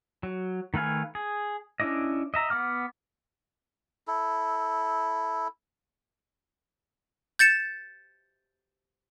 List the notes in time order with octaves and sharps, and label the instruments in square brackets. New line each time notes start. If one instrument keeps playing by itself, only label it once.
[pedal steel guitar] F#3
D#3 A3 B4 F5 G#5
G#4
C#4 D4 E4 D5 D#5
D#5 E5 A#5
B3 F#5 D6 F6
[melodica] E4 A4
[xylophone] G6 A6 C#7 E7